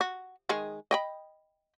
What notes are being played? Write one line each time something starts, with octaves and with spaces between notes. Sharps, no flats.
F#4
D#3 G#3 G#4
D#5 G5 B5